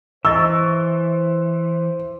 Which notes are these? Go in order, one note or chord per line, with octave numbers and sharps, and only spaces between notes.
E3 E4 C5 D#5 C#6 E6